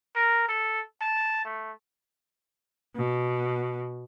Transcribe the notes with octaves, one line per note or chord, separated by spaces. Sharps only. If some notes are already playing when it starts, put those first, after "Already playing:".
A#4
A4
A5
A3
B2